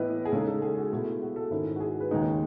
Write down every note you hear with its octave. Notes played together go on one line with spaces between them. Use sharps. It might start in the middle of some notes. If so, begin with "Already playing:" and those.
Already playing: A2 E3 B3 E4 B4 D#5
G#4
C#3 G#3 D#4 A4
A4
G#4
F#4
B2 A3 E4 G#4
F#4
A4
G#2 D#3 G#3 C#4 E4
F#4
G#4
B4
D#2 C#3 G#3 D#4